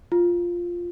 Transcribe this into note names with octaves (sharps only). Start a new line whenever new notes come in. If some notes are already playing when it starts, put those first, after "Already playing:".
F4